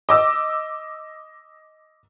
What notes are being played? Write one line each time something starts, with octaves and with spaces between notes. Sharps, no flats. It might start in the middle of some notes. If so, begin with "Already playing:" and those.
D#5 D6 E6